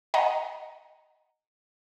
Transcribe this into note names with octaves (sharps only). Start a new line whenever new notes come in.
D#5 F#5 G#5 A#5